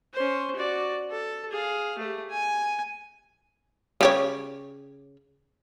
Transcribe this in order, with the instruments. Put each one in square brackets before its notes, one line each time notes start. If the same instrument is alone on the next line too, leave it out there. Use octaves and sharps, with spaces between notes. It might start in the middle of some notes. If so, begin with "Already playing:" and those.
[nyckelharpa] C#4 C5
F#4 D5
A4
G#4 F5
A3 G4
G#5
[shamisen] C#3 G4 C#5